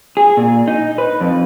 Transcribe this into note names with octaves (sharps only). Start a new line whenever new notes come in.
G#4
A#2
D#4
B4
F2